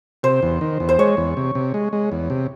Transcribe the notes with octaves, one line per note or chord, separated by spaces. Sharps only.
C3 C5
E2
D#3
E2
C5
G#3 C#5
E2
C3
C3
G#3
G#3
E2
C3